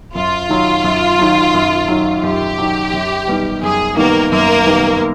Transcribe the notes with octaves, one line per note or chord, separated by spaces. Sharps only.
F#2 F4
D#3 F#3
F#2
D#3 F#3
F#2
D#3 F#3
F#2 G4
D#3 F#3
F#2
D#3 G3 B3
F#2 G#4
D#3 G3 A#3 B3 A#4
F#2 A#3 A#4
D#3 G3 B3